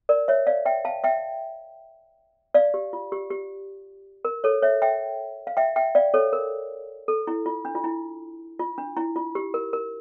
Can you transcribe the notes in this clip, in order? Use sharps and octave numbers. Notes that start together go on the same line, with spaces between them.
A#4 D5
C#5 E5
D5 F5
E5 G5
F5 A5
E5 G5
D5 F5
G4
F4
G4
G4
A#4
A4 C#5
C#5 E5
E5 G5
F5
E5 G5
E5 G5
D5 F5
A4 C#5
A#4
A4
E4
F4
D4
F4
E4
F4
D4
E4
F4
G4
A#4
A#4